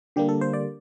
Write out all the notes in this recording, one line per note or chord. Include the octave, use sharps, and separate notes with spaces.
D3 G3 A#3 G4
A4
C5
D5